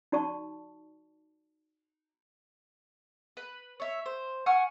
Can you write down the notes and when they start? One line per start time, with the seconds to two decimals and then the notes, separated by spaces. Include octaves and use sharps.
0.12 D#4 F#4 D5 A5 C#6
3.37 B4
3.80 C#5 E5
4.06 C5
4.46 F#5 G#5 C#6 F6